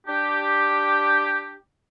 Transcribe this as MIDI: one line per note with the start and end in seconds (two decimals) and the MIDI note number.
0.07 1.54 62
0.07 1.54 67